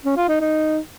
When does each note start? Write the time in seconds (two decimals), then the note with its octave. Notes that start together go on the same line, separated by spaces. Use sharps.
0.05 C#4
0.17 F4
0.29 D#4
0.41 D#4